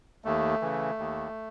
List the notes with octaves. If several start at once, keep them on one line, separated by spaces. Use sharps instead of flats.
D#2 A3
C#3 E3
D#2